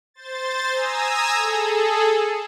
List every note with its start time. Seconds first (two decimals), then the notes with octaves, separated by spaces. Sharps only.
0.14 C5 A6
0.71 G#5 A#5 D#6 E6
1.33 G#4 A4